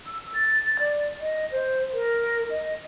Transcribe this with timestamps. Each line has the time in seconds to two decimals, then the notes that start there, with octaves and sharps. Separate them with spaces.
0.07 E6
0.34 A6
0.80 D5
1.21 D#5
1.51 C5
1.94 A#4
2.50 D#5